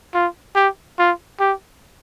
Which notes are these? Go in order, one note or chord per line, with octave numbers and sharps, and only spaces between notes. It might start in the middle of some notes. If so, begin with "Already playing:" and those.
F4
G4
F4
G4